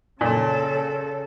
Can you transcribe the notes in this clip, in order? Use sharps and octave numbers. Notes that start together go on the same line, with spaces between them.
A#2 C#3 A4